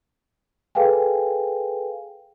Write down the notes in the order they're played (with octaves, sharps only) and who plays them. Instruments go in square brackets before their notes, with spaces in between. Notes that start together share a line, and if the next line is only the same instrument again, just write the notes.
[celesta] G#4 A4 B4 F5 G5 G#5